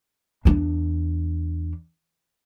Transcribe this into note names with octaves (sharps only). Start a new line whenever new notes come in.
E2 D4